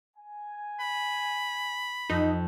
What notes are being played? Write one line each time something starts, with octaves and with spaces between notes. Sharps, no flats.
G#5
B5
F2 D#4